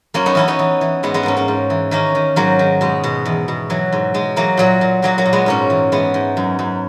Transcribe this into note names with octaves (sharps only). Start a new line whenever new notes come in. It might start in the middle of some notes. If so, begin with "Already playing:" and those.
F#2 A#3 C#4
B3 D#4
E3 C#4 E4
B3 D#4
E3
E3
G#2 G#3 B3
G#3 B3
G#2 A#3 C#4
A#3 C#4
G#2
E3
D#3 A#3 C#4
D#3
G#2 F#3 A#3
D#3
B2 G#3
B2
E2
B2
E3 F#3
G#2
G#2 G#3
E3 F#3 A#3
A#2 F#3 A#3
A#2
A#2 F#3 A#3
F#3 A#3
A#2
G#3 B3
G#2 A#3 C#4
E3
E3 G#3 B3
G#2
F#2
F#2